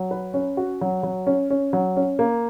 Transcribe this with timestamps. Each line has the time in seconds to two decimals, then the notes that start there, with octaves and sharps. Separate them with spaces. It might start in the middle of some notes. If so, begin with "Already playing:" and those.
Already playing: F#3
0.11 B4
0.34 C#4
0.57 F#4
0.81 F#3
1.03 F#3
1.27 C#4
1.50 C#4
1.73 F#3
1.97 C#4
2.19 A#3